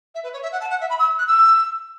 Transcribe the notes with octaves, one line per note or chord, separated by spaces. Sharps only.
E5
B4
C#5
E5
F#5
A5
F#5
E5
B5
E6
F#6
E6